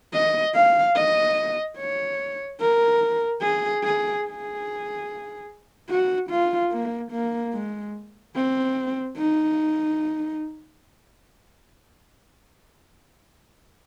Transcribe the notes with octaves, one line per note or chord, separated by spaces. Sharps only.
D#5
F5
D#5
C#5
A#4
G#4
G#4
G#4
F#4
F4
A#3
A#3
G#3
C4
D#4